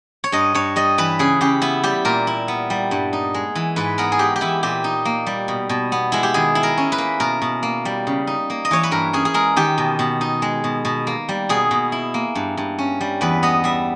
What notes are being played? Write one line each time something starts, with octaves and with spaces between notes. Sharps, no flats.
C#5
G2 D#5
G2 C#5
G3 D#5
E3 B4
C#3 G#4
C#3 G4
B3 E4
G3 G4
A#2 A#4
E4
B3
G3
G2
D#4
G#3
E3
G#2 B4
B3 A#4
G#4
G#3 G4
G4
E3 E4
A#2 G4
D#4
A#3
G3
B2
B2
B3
G#3 E4
G4
D#3 G#4
E4
A#4
C#4
B4
A#3
B2 A#4
B2
A#3
G3
C#3
D#4
A#3
D#5
E3 C#5
B4
G2 A#4
C#4 G#4
G#4
G#3 A#4
D#3 G4
B2
B2
D#4
G#3
B2
B2
A#3
G3
B2 G#4
B2
E4
A#3
G2
G2
C#4
G3
E2 B4
B3 D#5
G3 E5